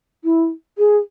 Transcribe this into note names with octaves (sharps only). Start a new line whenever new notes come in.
E4
G#4